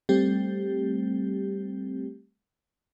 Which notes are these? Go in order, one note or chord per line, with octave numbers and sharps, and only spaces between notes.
G3 A3 C4 G4